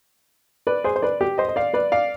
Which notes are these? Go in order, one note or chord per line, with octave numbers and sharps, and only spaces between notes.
B4 D5
G#4 C5
C5
B4 D5
G4
C5 D#5
D#5
D5 F5
B4 D5
D5 F5